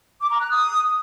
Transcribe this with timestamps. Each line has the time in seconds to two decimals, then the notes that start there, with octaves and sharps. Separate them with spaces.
0.21 D6
0.31 A#5
0.40 F#6
0.50 D#6